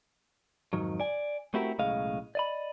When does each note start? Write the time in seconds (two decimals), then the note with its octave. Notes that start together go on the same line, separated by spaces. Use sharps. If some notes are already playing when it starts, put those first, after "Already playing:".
0.73 F2 G#2 D#3 F#3
1.00 D5 G#5
1.54 A3 C4 E4 F#4 G4 A#4
1.79 B1 A2 C#3 G#3 D#5 F5
2.35 D5 D#5 B5